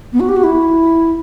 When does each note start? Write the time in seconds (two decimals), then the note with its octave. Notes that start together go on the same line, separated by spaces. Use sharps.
0.13 B3
0.20 F#4
0.29 G4
0.36 F#4
0.44 E4